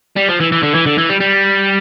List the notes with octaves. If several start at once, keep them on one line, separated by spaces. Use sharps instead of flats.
G3
F3
E3
E3
D3
E3
D3
E3
G3
G3